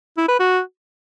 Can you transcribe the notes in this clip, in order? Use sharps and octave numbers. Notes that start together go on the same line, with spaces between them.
E4
B4
F#4